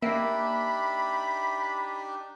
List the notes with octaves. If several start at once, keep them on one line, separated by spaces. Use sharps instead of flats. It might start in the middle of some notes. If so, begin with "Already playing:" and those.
A#3 D4 D#4 G4 E5 B5